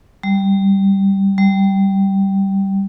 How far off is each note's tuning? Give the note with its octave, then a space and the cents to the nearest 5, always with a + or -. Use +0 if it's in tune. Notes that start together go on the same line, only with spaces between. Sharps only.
G3 -5
G3 -10